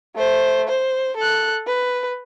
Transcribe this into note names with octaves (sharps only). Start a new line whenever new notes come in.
A3 C5
C5
A4 F#6
B4